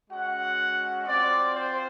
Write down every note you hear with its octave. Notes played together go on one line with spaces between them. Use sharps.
G#3 C#4 F#4 F#5
C4 F4 D5
C5